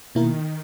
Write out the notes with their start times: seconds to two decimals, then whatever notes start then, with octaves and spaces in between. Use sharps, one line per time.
0.14 B2 D#3 A#3 E4 A#4